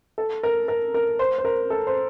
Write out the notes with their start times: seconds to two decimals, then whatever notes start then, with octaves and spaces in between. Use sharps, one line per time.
0.18 A4
0.43 A#4
0.68 A#4
0.94 A#4
1.19 C5
1.38 C5
1.45 A#4
1.70 A4
1.87 C5